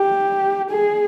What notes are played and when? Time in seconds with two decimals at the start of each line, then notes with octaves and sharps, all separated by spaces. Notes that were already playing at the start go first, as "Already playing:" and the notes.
Already playing: G4
0.70 G#4